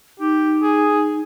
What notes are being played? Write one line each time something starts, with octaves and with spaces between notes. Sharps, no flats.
D#4 G4
G#4